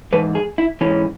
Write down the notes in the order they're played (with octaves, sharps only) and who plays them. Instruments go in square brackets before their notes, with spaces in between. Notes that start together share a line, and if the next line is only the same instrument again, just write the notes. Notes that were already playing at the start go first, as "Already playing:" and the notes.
[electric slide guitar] G#2 E3 B4
G#4
E4
G#2 E3 C#4